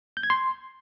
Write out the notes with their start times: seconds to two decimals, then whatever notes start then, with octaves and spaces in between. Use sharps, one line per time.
0.17 G6
0.23 G#6
0.30 C6